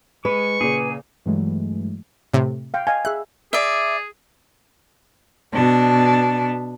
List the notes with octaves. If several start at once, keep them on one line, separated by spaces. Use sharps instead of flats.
G#3 B4 C#6
A#2 C#3 G#4
G2 E3 F#3 G#3 A3
A2 C3
F5 G5
D#5 F5 G#5
G#4 E5 F#6
G#4 D5 E5
B2 D4